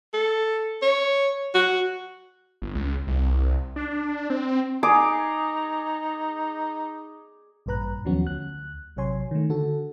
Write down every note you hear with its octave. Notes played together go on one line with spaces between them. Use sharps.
A4
C#5
F#4
G1
C#2
C2
D4
C4
D#4 G#4 D6
A1 G2 A#2 B4 A#5 F#6
D#2 F3 F#3 B3 C#4 F#4
D2 F#6
A1 C3 F#3 C#5 G#5 C6
D#3 A3
D3 F#4 A4